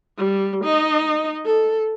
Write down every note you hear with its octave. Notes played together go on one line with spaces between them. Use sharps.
G3
D#4 D#5
A4